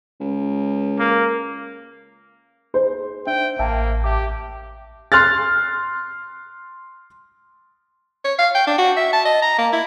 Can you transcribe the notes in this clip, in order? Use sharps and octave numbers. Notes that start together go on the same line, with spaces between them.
C#2
A#3
D#4 G#4 C5
D4 E5 G5
A1 A#3 E5 G5 A5
G4 E5 A5 D6
C6 F6 F#6 A6
C#5
F5
G5
D4
F#4
E5
A5
D#5
A#5
A#3
E4